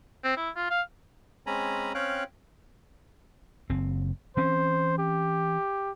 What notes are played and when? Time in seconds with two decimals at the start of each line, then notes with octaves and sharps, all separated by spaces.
0.24 C4
0.37 E4
0.56 F4
0.70 F5
1.47 G#3 C4 C#4 G#5 A#5 B5
1.94 C4 C#4 C#5 F5 G5 F#6
3.70 F#1 C4
4.37 E3 C4 C#4 C5
4.99 G4